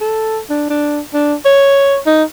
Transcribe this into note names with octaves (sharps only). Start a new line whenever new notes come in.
A4
D4
D4
D4
C#5
D#4